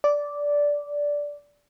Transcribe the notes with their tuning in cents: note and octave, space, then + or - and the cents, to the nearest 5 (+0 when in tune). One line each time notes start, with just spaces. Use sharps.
D5 -10